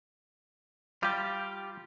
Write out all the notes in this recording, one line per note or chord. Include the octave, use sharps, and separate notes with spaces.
G3 F4 G4